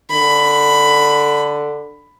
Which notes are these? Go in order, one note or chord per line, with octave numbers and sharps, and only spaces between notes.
D3 B5